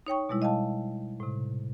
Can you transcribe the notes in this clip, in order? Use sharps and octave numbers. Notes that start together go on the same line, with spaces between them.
D#4 C#5 G5 C#6
B2 G3 G#3 E4
D#5 F5 G5 A5
A2 C3